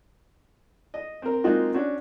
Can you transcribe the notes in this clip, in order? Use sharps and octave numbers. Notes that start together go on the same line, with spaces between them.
D#5
C4 A#4
G#3 A#3 C4 D#4 F4 F#4
C#4 D4 F#4